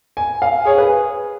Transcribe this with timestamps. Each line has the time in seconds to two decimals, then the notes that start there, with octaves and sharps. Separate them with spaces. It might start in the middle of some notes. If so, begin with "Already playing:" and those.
0.17 G#5
0.42 F5
0.66 G#4 C#5
0.78 B4